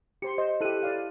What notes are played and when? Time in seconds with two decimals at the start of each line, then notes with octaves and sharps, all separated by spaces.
0.22 G4 C5 C6 C#7
0.38 C5 D#5
0.61 E4 G4 A4 F#6 D#7
0.83 E4 D5 F5